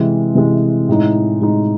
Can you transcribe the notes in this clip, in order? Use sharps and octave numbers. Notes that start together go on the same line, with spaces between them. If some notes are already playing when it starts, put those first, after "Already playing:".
Already playing: C3 E3 G#3
C3 E3 G#3
A2 G#3 D#4
A2 G#3 D#4